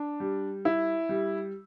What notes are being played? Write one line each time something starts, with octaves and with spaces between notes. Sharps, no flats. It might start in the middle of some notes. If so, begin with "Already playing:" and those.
Already playing: D4
G3
E4
G3